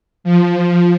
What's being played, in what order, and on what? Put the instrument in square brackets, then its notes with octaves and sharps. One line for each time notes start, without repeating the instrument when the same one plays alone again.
[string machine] F3